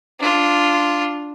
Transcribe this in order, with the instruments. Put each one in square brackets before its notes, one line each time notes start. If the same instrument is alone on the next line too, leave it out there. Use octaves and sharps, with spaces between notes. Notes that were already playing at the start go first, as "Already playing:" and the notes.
[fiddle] D4 F4